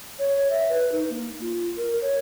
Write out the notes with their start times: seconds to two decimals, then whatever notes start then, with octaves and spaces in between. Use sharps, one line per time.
0.19 C#5
0.50 E5
0.69 B4
0.92 D#4
1.10 A#3
1.41 F4
1.77 A#4
2.02 C#5